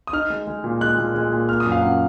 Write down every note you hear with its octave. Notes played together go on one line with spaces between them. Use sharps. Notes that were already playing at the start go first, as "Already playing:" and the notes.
D#6
D#4 F6
G#3
G#3
A#2
G#3 F#6
A#2
G#3
A#2
A#3 F6
D#6
F#2
F5
F#2 F#5